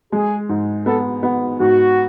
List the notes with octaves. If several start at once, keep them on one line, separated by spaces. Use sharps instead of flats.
G#3 G#4
G#2
B3 A4
B3
G#2 F#4